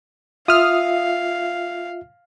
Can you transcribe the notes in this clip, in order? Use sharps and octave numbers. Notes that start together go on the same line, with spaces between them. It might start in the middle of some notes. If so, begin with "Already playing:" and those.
F4 E5 F5 D#6 F6